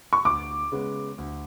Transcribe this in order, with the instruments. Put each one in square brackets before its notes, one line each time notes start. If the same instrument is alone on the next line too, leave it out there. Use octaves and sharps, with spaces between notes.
[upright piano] C#6
[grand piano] D2 [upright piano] D6
[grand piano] C#3 G#3 B3
D2